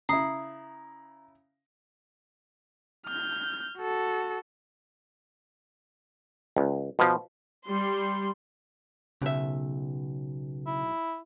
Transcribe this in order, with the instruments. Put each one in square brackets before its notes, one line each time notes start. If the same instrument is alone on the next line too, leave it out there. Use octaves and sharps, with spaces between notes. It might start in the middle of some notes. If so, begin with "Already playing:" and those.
[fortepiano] C#3 E4 [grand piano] A#5 [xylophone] D#6 C7
[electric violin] F6 G6
F#4 A4
[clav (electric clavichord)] C#2
B2 F3
[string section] G3 C6
[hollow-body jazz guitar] B1 E5 [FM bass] C#3
[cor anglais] E4